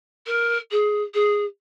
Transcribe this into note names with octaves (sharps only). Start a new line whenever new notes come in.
A#4
G#4
G#4